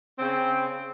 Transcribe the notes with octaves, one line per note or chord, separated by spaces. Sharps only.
C#3 C4